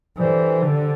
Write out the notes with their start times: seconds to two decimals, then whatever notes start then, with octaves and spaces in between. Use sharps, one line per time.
0.18 E3 G3 D4 A4 C5
0.62 D3 G3 D4 A4 C5